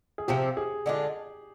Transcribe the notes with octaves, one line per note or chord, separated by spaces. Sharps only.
G#4
C3 F3 C4 G4
G#4
D3 G#3 D4 F4